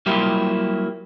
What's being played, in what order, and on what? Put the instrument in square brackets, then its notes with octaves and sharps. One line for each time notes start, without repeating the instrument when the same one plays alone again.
[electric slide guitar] F#3 G3 A#3 E4 F4 G4